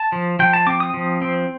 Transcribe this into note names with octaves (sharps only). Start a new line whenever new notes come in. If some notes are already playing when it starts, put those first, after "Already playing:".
Already playing: A5
F3
F3 G5
A5
C4 D6
D#6
F3
C4